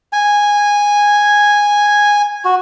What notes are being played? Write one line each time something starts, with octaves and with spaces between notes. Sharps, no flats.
G#5
F#4